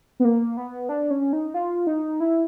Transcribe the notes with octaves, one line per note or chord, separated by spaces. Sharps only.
B3
A#3
B3
D4
C#4
D#4
F4
D#4
E4